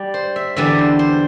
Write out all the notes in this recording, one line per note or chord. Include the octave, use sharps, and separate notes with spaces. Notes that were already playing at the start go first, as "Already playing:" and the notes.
Already playing: G3
C5
E5
E2 D3 G3 B3 E5
C5
C5